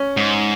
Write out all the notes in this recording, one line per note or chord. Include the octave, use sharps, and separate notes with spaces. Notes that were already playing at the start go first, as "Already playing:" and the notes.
Already playing: C#4
G#2